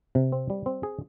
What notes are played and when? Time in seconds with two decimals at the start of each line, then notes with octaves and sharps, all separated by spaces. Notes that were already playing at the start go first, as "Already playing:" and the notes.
0.15 C3
0.32 C4
0.50 G3
0.66 C4
0.83 G#4